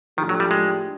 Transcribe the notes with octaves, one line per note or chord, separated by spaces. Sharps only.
A2 D#3 F3 A3 D4 G4
F#3
G3
G#3